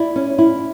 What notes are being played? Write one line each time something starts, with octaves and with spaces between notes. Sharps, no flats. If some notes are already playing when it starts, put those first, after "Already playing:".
Already playing: E4 D5
C#4
E4